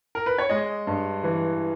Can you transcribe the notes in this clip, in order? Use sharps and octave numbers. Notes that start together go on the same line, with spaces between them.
A#4
B4
C#5
G#3 D#5
G2
E3